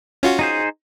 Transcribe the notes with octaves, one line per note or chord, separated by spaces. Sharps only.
C#4 F4 F#4
D#4 G#4 C5